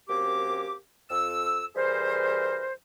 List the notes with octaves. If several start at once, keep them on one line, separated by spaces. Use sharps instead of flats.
F#2 A#3 C4 G4 D6
F2 E6
E3 G3 G#4 A#4 C5